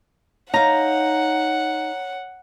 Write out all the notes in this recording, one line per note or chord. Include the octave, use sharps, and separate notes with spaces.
D#4 C#5 F5 F#5 A#5